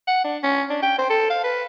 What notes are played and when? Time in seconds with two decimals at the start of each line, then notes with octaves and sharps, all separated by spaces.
0.07 F#5
0.24 D4
0.43 C#4
0.70 D4
0.82 G5
0.98 C5
1.10 A4
1.30 F5
1.44 B4